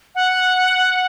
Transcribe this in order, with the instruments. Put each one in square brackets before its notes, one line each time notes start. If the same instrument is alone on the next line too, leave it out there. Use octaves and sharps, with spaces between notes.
[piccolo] F#5